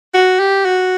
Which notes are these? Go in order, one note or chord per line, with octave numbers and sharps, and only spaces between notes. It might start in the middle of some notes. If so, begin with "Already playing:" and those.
F#4
G4
F#4